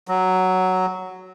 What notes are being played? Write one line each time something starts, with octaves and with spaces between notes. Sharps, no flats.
F#3